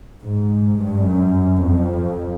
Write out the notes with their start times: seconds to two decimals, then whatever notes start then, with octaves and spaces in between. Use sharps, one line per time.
0.23 G#2
0.80 G2
1.09 F#2
1.64 F2